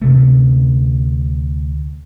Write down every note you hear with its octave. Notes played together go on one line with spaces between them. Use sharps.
D2 C3 A3